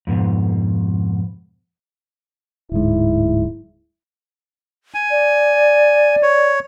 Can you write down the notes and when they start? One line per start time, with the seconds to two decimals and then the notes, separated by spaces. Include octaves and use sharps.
0.07 F2 G#2 B2
2.72 D1 G#2 E4
4.94 G#5
5.11 D5
6.23 C#5